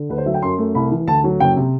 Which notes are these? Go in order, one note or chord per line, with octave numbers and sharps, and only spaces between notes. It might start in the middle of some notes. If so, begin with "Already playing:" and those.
Already playing: D3
D2 B4
C5
F#3 E5
G5
F#2 C6
A3
C2 B5
E3
D2 A5
F#3
F#1 G5
C3